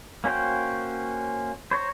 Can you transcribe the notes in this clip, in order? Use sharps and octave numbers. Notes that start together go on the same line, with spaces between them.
A#3 C#4 F#4 C5 G5
C5 C#5 A#5